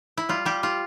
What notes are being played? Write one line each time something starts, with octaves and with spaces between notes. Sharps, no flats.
E4
G3 F4
G3 G4
G3 F4